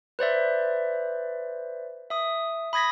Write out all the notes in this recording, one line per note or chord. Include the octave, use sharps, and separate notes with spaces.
B4 C5 D5 E5
E5 D#6
B5 D#6 G#6 A#6 B6